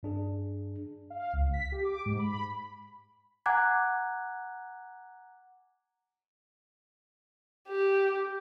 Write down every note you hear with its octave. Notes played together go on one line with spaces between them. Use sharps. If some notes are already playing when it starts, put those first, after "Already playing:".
G2 D4 G#4
F5
C#2
B6
G4
D6
G#2
B5
F#5 G#5 A#5 D6 F#6 G#6
G4